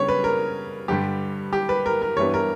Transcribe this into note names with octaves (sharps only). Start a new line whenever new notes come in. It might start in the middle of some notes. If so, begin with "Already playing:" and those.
Already playing: C#3 G3 B3 D4 C#5
B4
A#4
G2 D3 G3 G4
G4
B4
A#4
A#4
G2 E3 G3 B3 D4 C#5
A#4